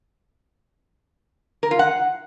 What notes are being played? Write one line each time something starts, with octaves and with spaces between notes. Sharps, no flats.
A#4
F4
F#5